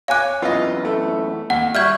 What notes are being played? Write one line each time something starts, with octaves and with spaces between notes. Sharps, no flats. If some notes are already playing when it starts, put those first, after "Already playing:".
C#5 F5 G#5 D6 F#6
F#2 E3 B3 F4 D#5
A3
D#2 F#5
G3 F#4 E5 F6 G6 G#6